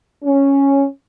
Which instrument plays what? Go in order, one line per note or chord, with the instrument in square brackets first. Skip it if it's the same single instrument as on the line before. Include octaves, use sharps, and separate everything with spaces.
[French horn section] C#4